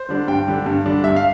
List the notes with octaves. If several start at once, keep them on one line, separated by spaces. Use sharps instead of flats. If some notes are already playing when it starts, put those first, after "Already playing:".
Already playing: C5
D3 G3 D4
G2 G5
D3 G3 D4
G2
D3 G3 D4
G2 E5
F5